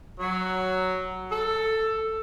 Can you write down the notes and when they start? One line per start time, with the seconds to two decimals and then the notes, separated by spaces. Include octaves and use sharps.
0.19 F#3
1.31 A4